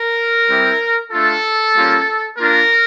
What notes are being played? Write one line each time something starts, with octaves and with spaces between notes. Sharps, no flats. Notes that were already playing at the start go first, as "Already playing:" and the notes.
Already playing: A#4
G3 C4 E4 G4
A3 D4 F4 A4
G3 A#3 C#4 F4
A#3 D4 F4 A#4